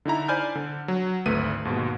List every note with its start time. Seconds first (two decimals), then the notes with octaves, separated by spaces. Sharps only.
0.05 D3 D#4 E4 A#5
0.28 C5 D5 G#5 B5 F6 G6
0.55 D3
0.88 F#3
1.26 G#1 D2 A3 B4 D#7
1.65 D#2 G#2 B2